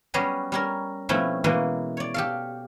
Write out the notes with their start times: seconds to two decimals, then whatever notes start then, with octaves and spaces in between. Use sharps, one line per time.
0.14 F#3 G3 B3 C#4 G#4 D#5
0.52 G3 C#4 A#4
1.09 B2 F3 A3 C4 C#4 E4
1.44 B2 E3 G#3 A#3
1.97 C#5 D5
2.14 G4 A4 F5